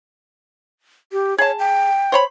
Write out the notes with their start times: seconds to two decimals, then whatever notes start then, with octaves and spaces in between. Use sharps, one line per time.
1.12 G4
1.38 G#4 C#5 A5
1.59 G5
2.12 C5 C#5 B5